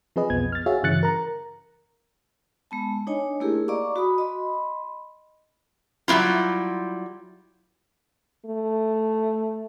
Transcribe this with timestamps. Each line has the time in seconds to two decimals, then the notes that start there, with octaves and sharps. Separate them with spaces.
0.16 F3 C4 G#4 B4 D#5
0.30 B1 F2 B3 G#6
0.52 F6 A6
0.66 F#4 G#4 C#5 E5 F5
0.83 G2 C#3 E3 F#6 A6 C#7
1.03 A#4 A#5
2.71 G#3 B3 A5
3.07 D4 D#4 C#5 D#5 G#5
3.40 A3 A#3 E4 G4 G#4 A#4
3.68 D5 D#5 F5 A#5 C#6 D6
3.96 F#4 B5 D#6
4.18 D#5 B5 C6
6.08 F#3 G3 A#3 E4 F4
8.46 A3